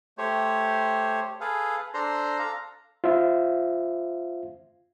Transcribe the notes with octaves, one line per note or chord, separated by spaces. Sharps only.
A3 G4 C5 C#5
G#4 A4 B4 F5
D4 A4 C5 A#5 C6
A4 F5 A#5
F4 C5 E5 F5